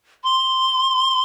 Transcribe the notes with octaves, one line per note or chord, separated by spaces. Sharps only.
C6